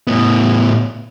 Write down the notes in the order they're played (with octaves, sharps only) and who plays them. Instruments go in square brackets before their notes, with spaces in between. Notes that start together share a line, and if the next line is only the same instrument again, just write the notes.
[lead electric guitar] A2 B3